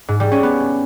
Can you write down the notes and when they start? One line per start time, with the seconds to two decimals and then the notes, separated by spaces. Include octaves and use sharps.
0.08 G#2
0.20 G3
0.32 C#4
0.43 B3